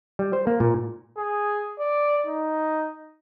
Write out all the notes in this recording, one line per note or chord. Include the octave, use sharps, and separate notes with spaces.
G3
C5
A#3
A#2
G#4
D5
D#4